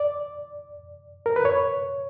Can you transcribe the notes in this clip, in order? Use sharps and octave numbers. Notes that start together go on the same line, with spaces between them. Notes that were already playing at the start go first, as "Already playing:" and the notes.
Already playing: D5
A#4
B4
C#5